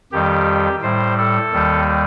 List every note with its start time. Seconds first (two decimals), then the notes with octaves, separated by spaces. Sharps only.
0.12 F2 D#3 G3 G4
0.82 A2 G3 C5
1.18 A4
1.53 D#2 D#3 G3